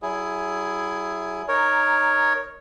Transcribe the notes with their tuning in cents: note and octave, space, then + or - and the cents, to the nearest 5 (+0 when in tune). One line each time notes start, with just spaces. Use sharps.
F#3 +45 E4 +10 G#4 +5
D#4 -15 A#4 +0 C#5 +0